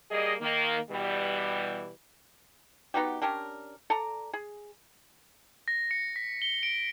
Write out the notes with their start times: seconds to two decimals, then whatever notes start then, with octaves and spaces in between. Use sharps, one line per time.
0.11 G3 A#3 G#4 D#5
0.41 D#3 A#3
0.91 B2 E3 G3
2.94 B3 D#4 F#4 G4
3.22 C#4 D4 G4 A#4
3.90 A4 D5 A#5
4.33 G#4
5.68 A#6
5.91 C#7
6.16 B6
6.42 G7
6.63 D7